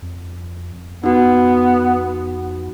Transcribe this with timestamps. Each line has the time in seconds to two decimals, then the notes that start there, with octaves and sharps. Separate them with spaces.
0.02 F2
1.03 F2 B3 D#4 F#4